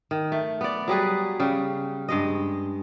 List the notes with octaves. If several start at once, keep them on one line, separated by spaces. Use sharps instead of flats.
D#3
A3
B3 D5
F#3 G3 G#4 B4
C#3 G3
G2 G#3 D#5